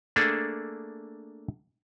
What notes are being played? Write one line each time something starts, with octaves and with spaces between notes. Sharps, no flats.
A3 A#3 D4 G#4 A4